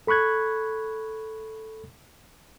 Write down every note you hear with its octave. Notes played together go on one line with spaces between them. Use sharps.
A4 B5 C#6 F#6 G#6